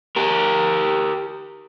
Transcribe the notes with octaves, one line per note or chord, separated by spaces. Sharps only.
G4 A#4